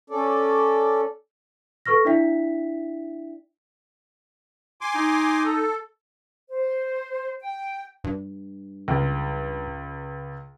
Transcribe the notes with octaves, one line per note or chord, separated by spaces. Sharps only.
C#4 A4 D5
A4 B4 C#6 F6 A#6
D4 E4 D5 E5 G5 B6
G#5 C6 D6
D#4
A4
C5
G5
G2
C#2